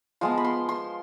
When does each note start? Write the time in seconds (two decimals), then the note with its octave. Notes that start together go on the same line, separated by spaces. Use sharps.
0.21 F3 G#3 B3 C6
0.37 B5
0.44 C6
0.69 C6